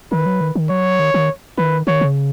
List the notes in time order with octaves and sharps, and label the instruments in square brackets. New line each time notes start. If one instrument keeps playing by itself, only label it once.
[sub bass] D#3 [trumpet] B4
[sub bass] F#3
D#3
D#3
[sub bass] F#3 [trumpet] C#5
[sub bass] D#3
D#3
[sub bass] D#3 [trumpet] B4
[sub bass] D#3 [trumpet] C#5
[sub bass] C#3